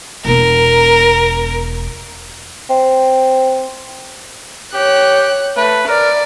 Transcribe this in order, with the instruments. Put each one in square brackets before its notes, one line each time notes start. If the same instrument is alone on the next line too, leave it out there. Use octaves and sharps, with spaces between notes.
[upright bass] E1 B3 [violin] A#4
[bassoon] C4
[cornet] G4 [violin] C#5 F#6
[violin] A3 [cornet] B4
[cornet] A#4 [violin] D5